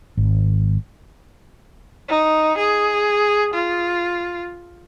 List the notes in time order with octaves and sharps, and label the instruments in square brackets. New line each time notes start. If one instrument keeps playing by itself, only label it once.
[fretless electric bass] G#1
[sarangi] D#4
G#4
F4